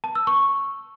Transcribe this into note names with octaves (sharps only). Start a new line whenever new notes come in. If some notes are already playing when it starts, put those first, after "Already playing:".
A5
E6
C#6